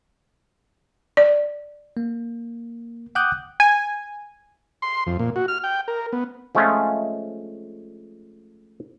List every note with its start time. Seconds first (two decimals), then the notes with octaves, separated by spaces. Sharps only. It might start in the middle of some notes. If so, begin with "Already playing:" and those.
1.17 D5
1.97 A#3
3.15 F#5 G5 D6 D#6 F#6 G6
3.60 G#5
4.82 C6
5.07 F2
5.19 A#2
5.36 F#4
5.48 F6
5.64 G5
5.88 A#4
6.13 B3
6.55 F3 G#3 A3 C4 C#4 F4